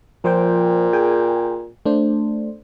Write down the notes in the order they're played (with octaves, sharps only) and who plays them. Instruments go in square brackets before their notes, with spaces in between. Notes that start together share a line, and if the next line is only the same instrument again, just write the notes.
[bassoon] A#2 [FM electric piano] F3 C5 G5
[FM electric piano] G#4 G5 G#5
A3 D4 C5